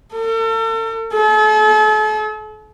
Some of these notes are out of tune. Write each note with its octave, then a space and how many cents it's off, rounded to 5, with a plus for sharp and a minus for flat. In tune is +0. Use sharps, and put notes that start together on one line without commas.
A4 +40
A4 -40